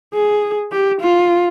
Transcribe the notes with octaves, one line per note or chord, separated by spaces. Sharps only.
G#4
G4
F4